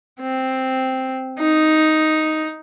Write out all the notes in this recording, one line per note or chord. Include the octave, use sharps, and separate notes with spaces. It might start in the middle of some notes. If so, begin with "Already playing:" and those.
C4
D#4